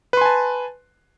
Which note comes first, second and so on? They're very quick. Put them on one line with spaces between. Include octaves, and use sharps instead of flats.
B4 C6 G#5 A5